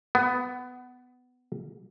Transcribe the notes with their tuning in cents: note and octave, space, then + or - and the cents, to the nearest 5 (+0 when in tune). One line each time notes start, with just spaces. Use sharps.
B3 +15